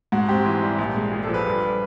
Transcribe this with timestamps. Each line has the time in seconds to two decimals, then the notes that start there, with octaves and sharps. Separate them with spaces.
0.12 G#2 F#4
0.29 C4 G4
0.45 E3
0.63 G3
0.78 A#1
0.96 G#3
1.12 A#2 G#4
1.24 F3 A4
1.34 B4
1.46 G2